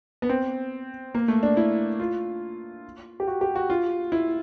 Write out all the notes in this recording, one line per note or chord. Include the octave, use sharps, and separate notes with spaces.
B3
C4
A#3
A3
D4
E4
F4
G4
F#4
G4
F#4
F4
E4